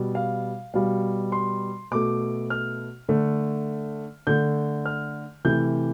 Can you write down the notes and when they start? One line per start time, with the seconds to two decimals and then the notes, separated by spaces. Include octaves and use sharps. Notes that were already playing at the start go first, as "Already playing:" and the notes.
Already playing: B2 G3
0.15 F5
0.74 B2 G3 F5
1.32 C6
1.91 B2 A3 D6
2.50 F6
3.09 D3 A3
4.27 D3 A3 G6
4.86 F6
5.45 C3 E3 A3 G6